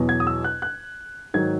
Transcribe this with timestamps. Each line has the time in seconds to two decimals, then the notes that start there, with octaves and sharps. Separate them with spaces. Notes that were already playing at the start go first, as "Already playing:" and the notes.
Already playing: E2 B2 F#3
0.09 G#6
0.20 D#6
0.27 E6
0.44 F#6
0.62 F#6
1.34 G#2 D#3 F#3 G#6